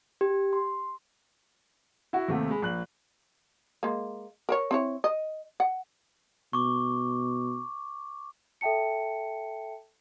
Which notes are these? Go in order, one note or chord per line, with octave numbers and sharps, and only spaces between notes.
G4
C6
E4 F#4
D#2 C3 A3
G#3 B5
A#1 F#6 F#7
G#3 A#3
A#4 C5 C#5
C4 E4 C#5
D#5
F#5
B2 C#6 D6
A4 E5 G5 A5 C#7